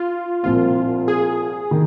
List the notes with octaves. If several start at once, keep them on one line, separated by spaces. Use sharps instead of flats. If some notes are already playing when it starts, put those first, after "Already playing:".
Already playing: F4
C2 A#2 F3 C4 F4
G#4
D#3